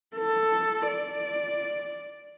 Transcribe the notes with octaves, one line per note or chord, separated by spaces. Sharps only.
A4
D5